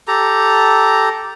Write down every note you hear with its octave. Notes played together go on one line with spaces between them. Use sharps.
G4 A4 A#5